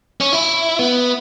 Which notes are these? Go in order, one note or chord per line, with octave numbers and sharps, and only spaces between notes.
C#4
E4
B3